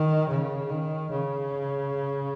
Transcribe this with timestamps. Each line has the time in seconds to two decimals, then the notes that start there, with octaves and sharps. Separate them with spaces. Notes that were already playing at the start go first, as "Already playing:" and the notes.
Already playing: D#3
0.29 C#3
0.70 D#3
1.11 C#3